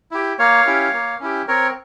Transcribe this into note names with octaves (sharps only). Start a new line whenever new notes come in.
E4 G4
A#3 C#5 F5
C#4 E4 G4
A#3
C#4 E4 G4
C4 A#4 C#5